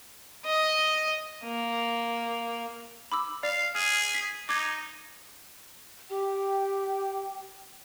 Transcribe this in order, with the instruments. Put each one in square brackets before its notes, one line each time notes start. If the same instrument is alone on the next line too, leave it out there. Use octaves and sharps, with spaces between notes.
[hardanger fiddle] D#5
A#3
[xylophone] B5 D6 E6
[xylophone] D5 [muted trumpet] F5
[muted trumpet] G#4 [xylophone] F6
[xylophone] B6
[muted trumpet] D#4 [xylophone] D6 G#6
[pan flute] G4 [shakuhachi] G5